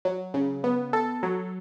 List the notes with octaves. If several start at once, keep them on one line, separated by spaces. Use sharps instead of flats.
F#3
C#3
B3
A4
F#3